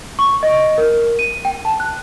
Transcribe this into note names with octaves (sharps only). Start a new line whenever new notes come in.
C#6
D#5
A#4
D#7
G5
A5
F#6